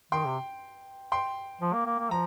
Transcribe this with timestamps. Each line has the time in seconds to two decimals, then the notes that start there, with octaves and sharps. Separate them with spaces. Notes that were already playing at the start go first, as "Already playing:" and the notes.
0.12 D#3 G5 C6
0.25 C3
1.12 G5 C6
1.61 F3
1.73 A#3
1.86 A#3
1.99 A#3
2.10 F3 A#5